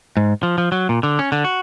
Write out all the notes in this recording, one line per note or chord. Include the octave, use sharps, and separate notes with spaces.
G#2
F3
F3
F#3
A#2
D3
C#4
D3
F#4